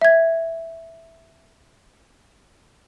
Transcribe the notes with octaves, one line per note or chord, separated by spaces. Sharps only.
E5 G#6